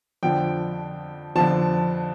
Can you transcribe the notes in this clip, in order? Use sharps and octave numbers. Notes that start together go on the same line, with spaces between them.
F2 D3 F3 G5
F2 D3 F3 A5